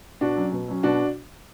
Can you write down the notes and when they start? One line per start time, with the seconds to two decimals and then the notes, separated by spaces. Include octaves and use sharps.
0.21 B2 D4 F#4
0.36 F#3 C#4
0.52 B2
0.68 F#3 C#4
0.83 B2 D4 F#4